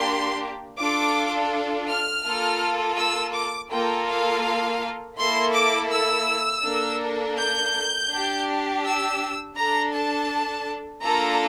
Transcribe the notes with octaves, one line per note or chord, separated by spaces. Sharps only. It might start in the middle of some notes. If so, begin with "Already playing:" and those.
Already playing: A#3 D4 G4 C6
D4 F4 A4 D6
F6
A#3 F4 A4
E6
D6
A#3 F4 A4 G5
F5
A#3 E4 A4 C6
D6
E6
A#3 D4 A4
G6
D4 G4
E6
D4 A4 A#5
A5
A#3 D4 F4 A4 A#5